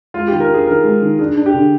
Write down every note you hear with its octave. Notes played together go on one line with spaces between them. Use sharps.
G#3 F4
D#3 G4
A#4
D4
G#4
D#3 A#4
G#3
D#3
D4 G#4
D4
G4
D3